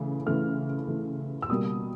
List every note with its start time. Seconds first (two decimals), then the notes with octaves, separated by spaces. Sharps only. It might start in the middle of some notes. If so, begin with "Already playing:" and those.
Already playing: C#3 E3 A3
0.26 C#3 E3 A3 F6
0.88 C#3 E3 A3
1.42 E6
1.49 B2 G3 A#3 D#6